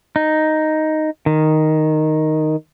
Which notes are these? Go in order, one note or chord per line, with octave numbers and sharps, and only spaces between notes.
D#4
D#3